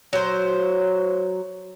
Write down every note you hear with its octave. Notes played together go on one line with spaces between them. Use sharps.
F#3 C5